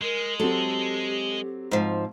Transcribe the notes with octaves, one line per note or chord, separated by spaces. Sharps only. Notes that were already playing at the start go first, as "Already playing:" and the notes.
G#3 A#4
F#3 C4 G4 A4
G#2 F3